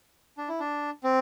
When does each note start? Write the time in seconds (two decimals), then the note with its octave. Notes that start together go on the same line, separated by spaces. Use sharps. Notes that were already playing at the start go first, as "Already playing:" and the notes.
0.38 D4
0.48 E4
0.60 D4
1.04 C4